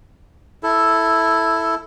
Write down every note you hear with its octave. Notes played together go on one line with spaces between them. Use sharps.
E4 A4